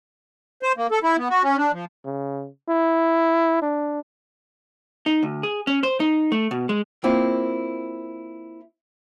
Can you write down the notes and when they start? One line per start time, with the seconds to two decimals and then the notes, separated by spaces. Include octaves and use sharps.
0.63 C5
0.77 A#3
0.91 A4
1.03 E4
1.18 B3
1.30 F#4
1.43 C#4
1.57 D4
1.72 F3
2.05 C#3
2.68 E4
3.62 D4
5.06 D#4
5.23 D2
5.43 G#4
5.67 C#4
5.83 C5
6.00 D#4
6.32 A3
6.51 B2
6.69 G#3
7.04 A#3 C4 E4 F4